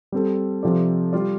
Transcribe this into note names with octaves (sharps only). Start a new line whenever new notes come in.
G3 C4 A4
C3 F3 C4 A4 D5
G3 F4 D5